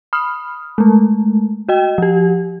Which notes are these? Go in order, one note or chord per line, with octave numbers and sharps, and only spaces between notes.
B5 D#6 F6
G#3 A3
F#4 D#5 G5
F3 G4